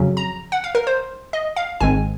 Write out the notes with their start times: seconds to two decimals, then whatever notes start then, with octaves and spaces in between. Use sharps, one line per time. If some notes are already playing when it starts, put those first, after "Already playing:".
Already playing: F2 C#3 F#3 C#4
0.17 A#5
0.52 F#5
0.64 F5
0.75 A#4
0.87 C5
1.33 D#5
1.56 F5
1.80 G#1 G#2 D#3 G#3 C4 G#5